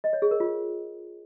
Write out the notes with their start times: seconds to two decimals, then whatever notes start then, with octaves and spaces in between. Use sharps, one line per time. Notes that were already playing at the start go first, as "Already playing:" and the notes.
0.04 D#5
0.13 C#5
0.22 G#4
0.31 A#4
0.40 F4